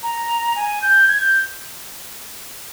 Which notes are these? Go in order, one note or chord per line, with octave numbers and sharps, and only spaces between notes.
A#5
G#5
G6
G#6
G6